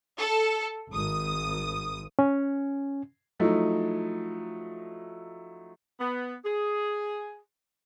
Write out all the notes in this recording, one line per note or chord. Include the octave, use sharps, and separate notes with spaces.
A4
G#1 D#6
C#4
F3 F#3 A3 D#4 E4
B3
G#4